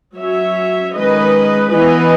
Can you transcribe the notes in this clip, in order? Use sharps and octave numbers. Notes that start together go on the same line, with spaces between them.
F#3 C#4 C#5 E5
D#3 G#3 C#4 B4 D#5
E3 B3 B4 D#5